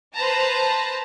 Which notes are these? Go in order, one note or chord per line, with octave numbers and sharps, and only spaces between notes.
B4 C5 A5 A#5